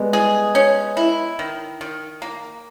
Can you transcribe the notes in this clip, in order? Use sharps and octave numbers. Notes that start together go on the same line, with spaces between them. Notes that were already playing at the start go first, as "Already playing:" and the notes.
Already playing: G3 G#3 B3
G#4
C#4
E4
D#3
D#3
A#3